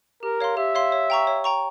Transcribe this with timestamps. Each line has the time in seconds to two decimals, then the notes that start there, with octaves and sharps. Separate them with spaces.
0.23 G4 A#4
0.41 C#5 F5 C6
0.57 G4 E5
0.75 C#5 F5 C6
0.92 C#5
1.10 G5 A#5 C#6
1.27 C#5
1.44 G5 A#5 C#6